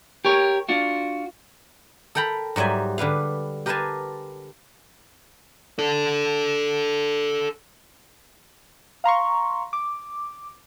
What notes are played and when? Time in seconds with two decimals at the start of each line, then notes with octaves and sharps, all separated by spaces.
0.25 G4 A#4 C#5
0.69 D4 F4 F#4
2.15 A4 A#4 G5 A#5 B5
2.56 G#2 F#3 G3 E5 G#5
2.98 D3 G3 B4 F5
3.66 G4 A#4 B4 F5 G#5 A5
5.79 A4 D5
9.04 F5 A#5 C6 C#6
9.73 D6